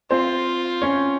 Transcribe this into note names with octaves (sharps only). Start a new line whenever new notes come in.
C4 F4 C5
C#4 C#5